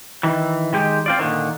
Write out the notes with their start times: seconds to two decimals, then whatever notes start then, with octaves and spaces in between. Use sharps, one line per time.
0.23 D#3 E3
0.73 D#3 G#3 G4
1.06 C4 F4 D5
1.19 A#2 D3 D#3